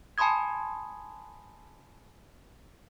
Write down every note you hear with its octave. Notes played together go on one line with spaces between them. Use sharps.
G#5 A5 B5 C6 D#6 G#6